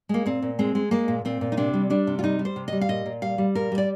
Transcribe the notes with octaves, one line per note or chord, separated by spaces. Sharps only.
G#3 A#3
A#2 C4
A#2
G#3 C4
G#3
G#3 A#3
A#2
A#2 C4
A#2
D#4
C3 D4
G3
G3 D4
C3
F4
G3 D#4
G3
C5
C3
G3 D#5
F5
A#2 D#5
A#2
G3 F5
G3
A#2 A#4
G3
D5